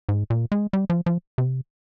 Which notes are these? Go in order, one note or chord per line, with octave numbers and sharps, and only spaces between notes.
G#2
A#2
G#3
G3
F3
F3
C3